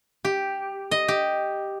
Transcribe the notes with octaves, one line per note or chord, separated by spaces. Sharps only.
G4
D#5
G4